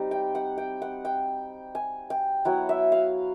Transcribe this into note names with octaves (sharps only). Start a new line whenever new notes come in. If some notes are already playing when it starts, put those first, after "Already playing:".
Already playing: G3 C4 D#4
G5
F#5
G5
F#5
G5
G#5
G5
F#3 B3 E4 F#5
E5
F5